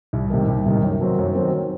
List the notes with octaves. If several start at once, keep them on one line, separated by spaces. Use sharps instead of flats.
C2
C3 D#3
C2
C3 D#3
F#2
D#3 F#3 C4
F#2
D#3 F#3 C4